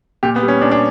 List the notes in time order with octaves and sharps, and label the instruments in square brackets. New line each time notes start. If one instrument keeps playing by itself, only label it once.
[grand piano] A#2 G4
B3
G3
C#4
A#2 D4
D4